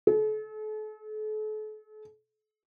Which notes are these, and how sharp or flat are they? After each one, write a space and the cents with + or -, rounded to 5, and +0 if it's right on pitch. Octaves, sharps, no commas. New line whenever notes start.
A4 -40